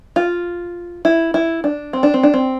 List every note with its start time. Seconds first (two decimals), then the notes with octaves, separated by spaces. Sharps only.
0.16 F4
1.05 E4
1.34 E4
1.64 D4
1.93 C4
2.03 D4
2.14 C4
2.23 D4
2.34 C4